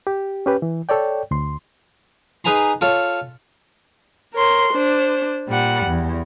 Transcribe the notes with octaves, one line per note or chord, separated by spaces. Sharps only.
G4
C#4 G4 B4
E3
A4 C#5 D5 G5
D2 C6
D#4 G#4 B4 G#5 A#5 C6
F4 A4 C#5
A#4 C#5 C6
D4 C5
A#2 G3 F#5
E2